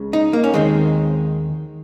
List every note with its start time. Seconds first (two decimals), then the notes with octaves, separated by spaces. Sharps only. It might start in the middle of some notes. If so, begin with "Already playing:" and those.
Already playing: C#2 C#3 G#3
0.13 D#4
0.33 A#3
0.44 C#4
0.54 D#2 D#3 G#3 C4